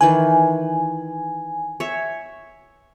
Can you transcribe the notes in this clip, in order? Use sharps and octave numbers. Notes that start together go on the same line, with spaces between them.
D#3 E3 B4 G#5
C#5 E5